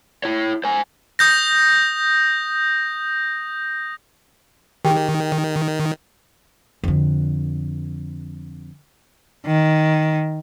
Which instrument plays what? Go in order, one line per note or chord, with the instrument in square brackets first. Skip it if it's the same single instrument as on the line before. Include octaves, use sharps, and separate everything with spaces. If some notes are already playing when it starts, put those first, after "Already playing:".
[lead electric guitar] E4 C#5
C5 G#5
[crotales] D#6 G6 A#6
[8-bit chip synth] D#3 [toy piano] G4 G#4 G5
[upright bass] F2 D3
[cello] D#3